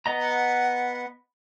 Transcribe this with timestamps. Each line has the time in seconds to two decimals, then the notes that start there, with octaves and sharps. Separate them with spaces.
0.06 B3 D#5 A#5
0.19 F#5